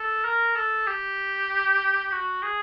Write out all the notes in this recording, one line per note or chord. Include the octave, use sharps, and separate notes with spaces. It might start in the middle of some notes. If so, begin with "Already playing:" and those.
Already playing: A4
A#4
A4
G4
F#4
G#4